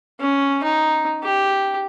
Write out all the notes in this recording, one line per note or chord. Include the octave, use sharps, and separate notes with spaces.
C#4
D#4
G4